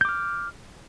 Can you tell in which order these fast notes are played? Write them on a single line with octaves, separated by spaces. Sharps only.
G6 D6 F6